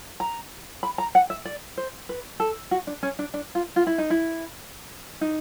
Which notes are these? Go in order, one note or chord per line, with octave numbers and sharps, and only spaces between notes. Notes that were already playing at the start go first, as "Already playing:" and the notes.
A#5
B5
A#5
F#5
E5
D5
C5
B4
A4
F#4
D4
C#4
D4
D4
F4
F4
E4
D#4
E4
D#4